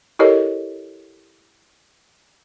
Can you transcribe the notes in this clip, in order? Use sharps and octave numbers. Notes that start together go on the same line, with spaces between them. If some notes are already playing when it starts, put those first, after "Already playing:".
E4 G4 A4 A#4 C#5 D#5